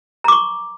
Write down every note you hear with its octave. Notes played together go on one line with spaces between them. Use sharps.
A#5 C#6 D6